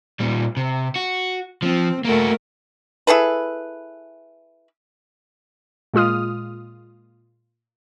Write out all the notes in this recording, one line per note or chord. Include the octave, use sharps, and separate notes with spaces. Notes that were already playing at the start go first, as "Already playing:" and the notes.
A#2 G3
C3
F#4
F3 C4
A3 A#3 F#4 A#4
E4 G#4 A4 B4
A#2 G#3 F4 D#6 F6